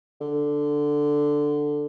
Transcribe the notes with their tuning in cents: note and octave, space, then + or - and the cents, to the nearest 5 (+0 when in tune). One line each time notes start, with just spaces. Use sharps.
D3 +5